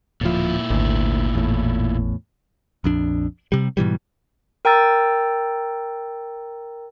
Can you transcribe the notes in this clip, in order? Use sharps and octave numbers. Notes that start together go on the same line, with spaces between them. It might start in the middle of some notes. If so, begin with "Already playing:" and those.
D1 A#2 F3 E4
G#1 D2
E2 A2
A#1 F2 D4
C3 G3
G#2 B2 E3 G3
A#4 G5 A#5 E6 A6